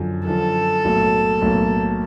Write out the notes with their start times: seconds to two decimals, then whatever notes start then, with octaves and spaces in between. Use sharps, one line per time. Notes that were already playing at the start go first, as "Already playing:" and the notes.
Already playing: F#2 D3 F3
0.27 F#2 D3 F3 A4
0.85 B1 A2 F#3 A#3
1.42 B1 A2 F#3 A#3